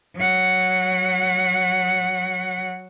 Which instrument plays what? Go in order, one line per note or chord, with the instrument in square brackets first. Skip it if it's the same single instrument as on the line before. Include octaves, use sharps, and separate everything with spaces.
[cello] F#3 F#5